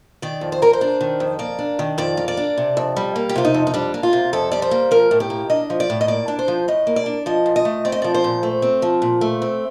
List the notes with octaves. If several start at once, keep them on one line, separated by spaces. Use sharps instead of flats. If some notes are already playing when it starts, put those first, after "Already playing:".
D#3 D5
F2
C5
A#3 A#4
C5
D4
D#3
F2
A#3 D5
D4
D#3
F2 D5
A#3
D5
D4
C3
F2
G3
A#3
G4
C3 F4
D#4
F2
D#4
G3 D4
A#3
F4
C3
F2 A4
G3 D5
C5
A#3
F3 A#4
A2
G4
A#3
D4 D#5
F3
D5
A2
D#5
A#3 D5
D4
C5
F3
A2 D#5
A#3
D5
D4
F3 D#5
A#2
D#5
A3
C4 D5
D#5
F3 D5
C5
A#2
A3
C4
F3
A#2
A3
C4